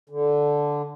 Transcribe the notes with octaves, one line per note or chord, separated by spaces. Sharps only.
D3